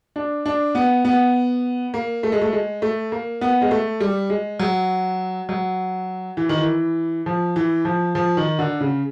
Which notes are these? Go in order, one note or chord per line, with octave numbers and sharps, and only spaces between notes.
D4
D4
B3
B3
A#3
A3
G#3
A3
G#3
A3
A#3
B3
G#3
A3
G3
G#3
F#3
F#3
E3
D#3
E3
F3
E3
F3
F3
D#3
D3
C#3